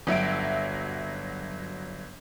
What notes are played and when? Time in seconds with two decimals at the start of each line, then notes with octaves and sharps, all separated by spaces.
0.07 G1 F#3 E5 D7